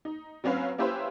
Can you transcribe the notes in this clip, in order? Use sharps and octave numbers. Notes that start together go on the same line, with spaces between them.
D#4
F#3 C4 C#4 B4 F5
A#3 C#4 E4 G4 B4 C5